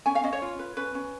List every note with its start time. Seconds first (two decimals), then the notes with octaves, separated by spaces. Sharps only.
0.06 C#4 G#5
0.15 F5
0.24 C#4 D#5
0.33 C#5
0.42 F4
0.59 B4
0.77 C#4 B4
0.95 C#4